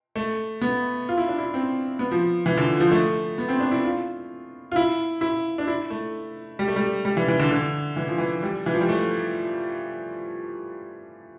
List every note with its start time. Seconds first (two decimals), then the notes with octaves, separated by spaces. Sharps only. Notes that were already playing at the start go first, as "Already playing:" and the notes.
0.16 A3
0.61 B3
1.09 F4
1.17 E4
1.28 D4
1.38 E4
1.54 C4
1.99 B3
2.11 F3
2.46 E3
2.57 D3
2.80 F3
2.92 A3
3.38 B3
3.49 C4
3.60 D4
3.72 E4
3.84 F4
4.72 F4
4.76 E4
5.21 E4
5.58 D4
5.67 E4
5.90 A3
6.59 G3
6.68 A3
6.76 G3
7.05 G3
7.17 E3
7.28 E3
7.39 D3
7.51 D3
7.96 E3
8.08 F3
8.18 E3
8.43 G3
8.66 E3
8.74 F3
8.81 G3
8.89 A3